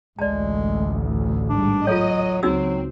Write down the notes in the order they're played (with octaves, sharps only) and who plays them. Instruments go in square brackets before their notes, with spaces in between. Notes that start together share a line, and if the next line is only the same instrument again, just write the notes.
[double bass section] A1 D2 [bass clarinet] G#3 [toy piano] D5 A5
[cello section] G#2 G3 [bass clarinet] D4
[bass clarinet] F#3 [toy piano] F4 A4 C#5 [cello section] D#5
[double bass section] C#2 [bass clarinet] F#3 [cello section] C4 [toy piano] D#4 F#4 E6